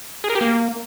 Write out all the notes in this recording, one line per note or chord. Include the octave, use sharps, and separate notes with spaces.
G#4
A#4
G4
A#3